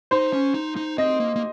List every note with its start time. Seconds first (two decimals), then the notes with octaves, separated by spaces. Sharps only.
0.11 D#4 C5
0.33 C#4
0.54 D#4
0.76 D#4
0.98 C4 D#5
1.20 A#3
1.36 A#3